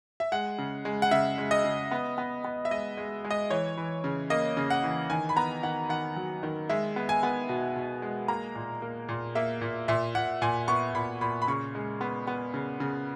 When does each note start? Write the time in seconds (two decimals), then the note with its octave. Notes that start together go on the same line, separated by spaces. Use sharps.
0.20 E5
0.32 G#3 F#5
0.59 C#3
0.85 G#3
1.02 F#5
1.11 C#3 E5
1.38 G#3
1.51 D#5
1.64 C#3
1.91 B3
2.18 B3
2.44 B3
2.65 E5
2.71 G#3 D#5
2.97 G#3
3.24 G#3
3.31 D#5
3.50 E3 C#5
3.77 E3
4.04 C#3
4.30 A#3 D#5
4.57 C#3
4.70 F#5
4.84 E3
5.10 D#3 G#5
5.29 B5
5.36 B3 A#5
5.63 D#3 F#5
5.89 D#3 F#5
6.16 F#3
6.43 D#3
6.69 G#3 E5
6.96 B3
7.09 G#5
7.23 B3
7.49 B2
7.76 B2
8.02 G#3
8.28 A#3 A#5
8.55 A#2
8.82 A#3
9.09 A#2
9.35 A#3 E5
9.61 A#2
9.88 A#2 E5
10.15 A#2 F#5
10.42 A#2 G#5
10.68 B3 C#6
10.95 A#2 B5
11.21 A#2 B5
11.42 B5
11.48 C#3 C#6
11.75 G#3
12.01 B3
12.27 B3
12.54 C#3
12.80 C#3